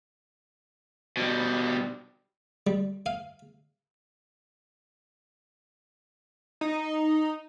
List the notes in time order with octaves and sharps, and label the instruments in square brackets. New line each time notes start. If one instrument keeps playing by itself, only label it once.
[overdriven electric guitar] B2 G3
[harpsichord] G3
F5
[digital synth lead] D#4